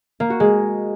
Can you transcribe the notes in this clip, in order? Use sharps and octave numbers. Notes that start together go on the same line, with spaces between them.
A#3
F#4
G#3